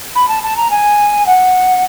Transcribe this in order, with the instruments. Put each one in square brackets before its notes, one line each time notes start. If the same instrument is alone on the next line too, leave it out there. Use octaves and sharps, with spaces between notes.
[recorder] B5
A5
A5
A#5
G#5
F#5